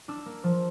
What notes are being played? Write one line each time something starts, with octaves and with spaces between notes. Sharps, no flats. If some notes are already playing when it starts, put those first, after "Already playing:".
D4 E6
A#3
F3